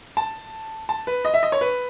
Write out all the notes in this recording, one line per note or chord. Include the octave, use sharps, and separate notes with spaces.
A5
A5
B4
D#5
E5
D#5
C#5
B4